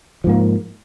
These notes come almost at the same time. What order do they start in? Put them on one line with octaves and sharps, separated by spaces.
F3 G#2 A#3